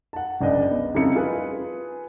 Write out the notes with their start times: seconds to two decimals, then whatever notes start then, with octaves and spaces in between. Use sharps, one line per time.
0.13 F#5 A5
0.41 F#1 C#2 D4 D5 D#5
0.71 B3
0.94 F2 C#3 G3 D#4 E4 C#7
1.15 F4 G#4 B4